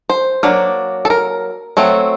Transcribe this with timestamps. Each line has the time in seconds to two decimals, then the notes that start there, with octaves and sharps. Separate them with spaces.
0.10 C5
0.43 F#3 A#3 D4
1.05 A4
1.10 A#4
1.77 F#3 A3 C4